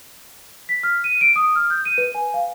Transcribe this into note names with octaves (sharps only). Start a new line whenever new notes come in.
B6
F6
D#7
D7
D#6
F6
G6
D#7
B4
G#5
F5